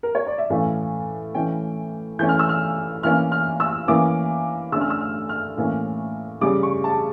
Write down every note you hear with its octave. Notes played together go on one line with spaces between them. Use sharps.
A#4
C#5
D5
E5
A2 E3 A3 C#4 F5
E3 A3 C#4 G5
E3 A3 C#4 G6
F6
E6
F6
E3 A#3 C#4 F6
F6
E6
E3 A#3 C#4 D6
D3 A3 C#4 E6
F6
E6
F6
F6
A2 E3 A#3 C#4
C#3 G3 C#4 D6
C#6
A5